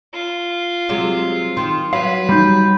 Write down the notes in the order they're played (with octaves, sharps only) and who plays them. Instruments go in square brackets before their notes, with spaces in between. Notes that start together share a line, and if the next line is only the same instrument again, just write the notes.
[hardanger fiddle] F4
[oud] C3 F#3 G#3
[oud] D#3 [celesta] C6
[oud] F#3 [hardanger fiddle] B4 [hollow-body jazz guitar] F5
[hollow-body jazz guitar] G3 D#4 [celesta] B5 G6